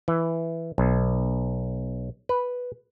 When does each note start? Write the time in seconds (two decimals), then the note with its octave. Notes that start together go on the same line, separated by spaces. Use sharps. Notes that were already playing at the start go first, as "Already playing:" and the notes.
0.08 E3
0.78 B1
2.29 B4